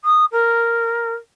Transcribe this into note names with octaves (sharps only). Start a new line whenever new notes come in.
D#6
A#4